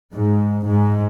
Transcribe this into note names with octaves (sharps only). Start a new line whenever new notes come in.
G#2
G#2